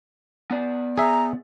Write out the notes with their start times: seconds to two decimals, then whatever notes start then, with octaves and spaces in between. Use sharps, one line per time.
0.51 B3 D5
0.97 G#4 E5 A#5